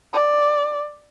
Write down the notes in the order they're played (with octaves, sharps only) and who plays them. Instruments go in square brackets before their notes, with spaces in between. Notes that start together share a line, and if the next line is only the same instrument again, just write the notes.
[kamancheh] D5